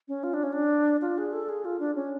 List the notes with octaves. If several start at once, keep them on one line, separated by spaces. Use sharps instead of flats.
C#4
F4
D4
C#4
D4
F4
G#4
A4
G#4
F4
D4
C#4